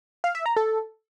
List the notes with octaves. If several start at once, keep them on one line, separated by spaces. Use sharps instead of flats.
F5
E5
A#5
A4